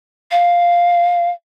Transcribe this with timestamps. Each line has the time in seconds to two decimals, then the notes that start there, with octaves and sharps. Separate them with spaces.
0.31 F5